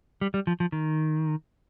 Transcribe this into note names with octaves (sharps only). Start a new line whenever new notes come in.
G3
G3
F3
F3
D#3